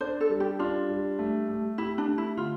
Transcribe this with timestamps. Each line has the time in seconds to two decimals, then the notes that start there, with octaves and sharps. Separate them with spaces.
0.01 D4 C5
0.21 A4
0.30 G3
0.40 G4
0.59 D4 F4
0.89 G3
1.19 A3
1.49 A3
1.78 E4 G4
1.98 D4
2.07 A3
2.18 E4
2.37 D3 F4